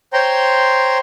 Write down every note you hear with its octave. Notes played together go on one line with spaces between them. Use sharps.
C5 C#5 G5 A#5 C6